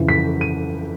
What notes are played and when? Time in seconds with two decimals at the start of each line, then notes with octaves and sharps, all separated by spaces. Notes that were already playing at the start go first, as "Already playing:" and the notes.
Already playing: F2 C#3 E3
0.09 B6
0.41 D#7